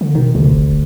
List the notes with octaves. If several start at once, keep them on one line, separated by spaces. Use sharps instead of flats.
D3
B2 D#3
D2 C3
F#1
D#1